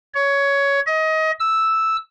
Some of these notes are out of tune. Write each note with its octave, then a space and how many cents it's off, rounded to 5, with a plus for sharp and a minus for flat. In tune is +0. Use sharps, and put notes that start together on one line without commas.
C#5 +15
D#5 +25
E6 -5